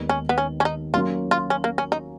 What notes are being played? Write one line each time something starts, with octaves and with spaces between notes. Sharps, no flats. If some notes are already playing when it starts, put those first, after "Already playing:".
Already playing: D#2 D#3 G#3 B3
C#4
B3
C#4
C#4
D#4
F#3 A#3 C#4 F4
F4
C#4
A#3
C#4
D#4